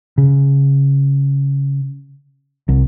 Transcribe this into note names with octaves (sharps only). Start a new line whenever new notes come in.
C#3
C2